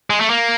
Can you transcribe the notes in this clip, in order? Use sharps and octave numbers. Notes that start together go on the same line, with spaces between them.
G#3
A3
A#3